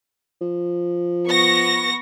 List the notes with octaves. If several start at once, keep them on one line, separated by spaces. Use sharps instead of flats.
F3
B3 C#6 A#6